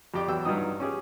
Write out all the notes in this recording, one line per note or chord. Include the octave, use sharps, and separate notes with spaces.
F2 G4 D5
E2 F#3 G5 E6
G2 F3 F#3 D#4 D#6
C#4 G4 G#4